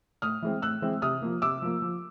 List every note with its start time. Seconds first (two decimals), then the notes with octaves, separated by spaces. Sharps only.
0.22 A2 D#6 F6
0.42 E3 G#3 C4
0.62 A2 E6 F#6
0.82 E3 G#3 C4
1.02 C3 D#6 F6
1.22 F3 A#3
1.42 C3 D6 E6
1.62 F3 A#3
1.82 F3